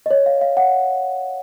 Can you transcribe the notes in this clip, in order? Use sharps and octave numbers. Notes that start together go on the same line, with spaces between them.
D#5
C#5
F5
F5
F#5